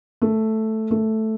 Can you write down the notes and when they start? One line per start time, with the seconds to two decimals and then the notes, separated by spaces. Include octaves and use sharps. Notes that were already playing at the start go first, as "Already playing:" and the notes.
0.22 A3
0.91 A3